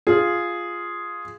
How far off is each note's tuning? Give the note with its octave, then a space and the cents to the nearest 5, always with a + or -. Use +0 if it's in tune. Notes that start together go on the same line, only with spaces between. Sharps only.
F4 +0 G#4 +0